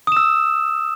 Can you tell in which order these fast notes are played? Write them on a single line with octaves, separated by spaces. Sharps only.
D#6 E7 E6